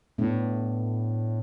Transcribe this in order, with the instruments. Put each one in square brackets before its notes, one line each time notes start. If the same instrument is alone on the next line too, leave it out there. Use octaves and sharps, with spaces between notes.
[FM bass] A2 [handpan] A3 B3 D4